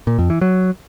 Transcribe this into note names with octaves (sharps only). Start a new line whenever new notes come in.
A#2
F2
E3
F#3